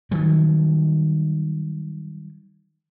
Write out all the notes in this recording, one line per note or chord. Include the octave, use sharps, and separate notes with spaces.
D#3 F#3 G3